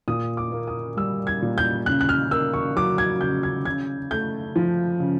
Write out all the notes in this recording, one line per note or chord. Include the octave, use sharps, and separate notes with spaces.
A#2 D#6
D6
A#3
D#6
G3 E6
G#6
A#2
G6
C#3 F#6
F#6
F6
A#3 E6
C#6
F#3 D6
G#6
C#3 G6
G#6
C#3 G#6
A3 G6
F3
C#3